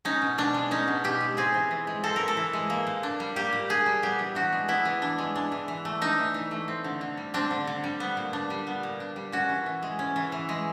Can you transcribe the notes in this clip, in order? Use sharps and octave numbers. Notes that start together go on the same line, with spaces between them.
C#4 D#4
B2
B2 D4
G#3
C#4 D#4
B2
B2 G4
G#3
C4 G#4
E3
E3
G#3
C4 A4
E3 A#4
A4
E3
G#3
A#3
A#2
D4
G3
A#3 G4
A#2
D4 G#4
G3
B3 G4
E3
D4 F#4
G#3
B3 E4
E3
D4
G#3
D4
E3
E3
A3
D4 D#4
E3
E3
A3
C4
D3
D3
G3
C4 D4
D3
D3
G3
B3
A#2
D4
G3
B3
A#2
D4
G3
C#4 F#4
E3
E3
G#3
C#4
E3
E3
G#3